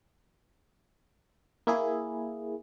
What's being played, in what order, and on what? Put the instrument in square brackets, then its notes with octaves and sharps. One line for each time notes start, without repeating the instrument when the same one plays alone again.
[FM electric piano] A#3 E4 G#4